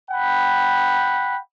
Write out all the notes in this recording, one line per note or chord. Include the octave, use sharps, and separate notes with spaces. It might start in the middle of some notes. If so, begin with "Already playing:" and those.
F#5 G5 B5